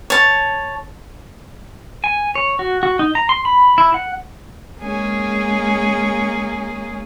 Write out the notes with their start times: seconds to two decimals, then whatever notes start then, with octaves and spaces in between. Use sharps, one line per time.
0.10 C#5 A5
2.04 G#5
2.35 C#5
2.59 F#4
2.83 F#4
2.99 D#4
3.15 A#5
3.29 C6
3.45 B5
3.78 E4
3.94 F#5
4.81 G#3 A#3 C#4 G#4